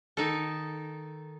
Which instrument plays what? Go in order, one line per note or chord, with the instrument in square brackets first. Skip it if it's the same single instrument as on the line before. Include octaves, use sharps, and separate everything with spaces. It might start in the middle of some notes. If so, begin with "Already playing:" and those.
[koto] D#3 D#4 A4